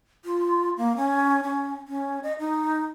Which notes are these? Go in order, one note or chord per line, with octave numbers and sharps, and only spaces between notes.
F4
A#3
C#4
C#4
C#4
D#5
D#4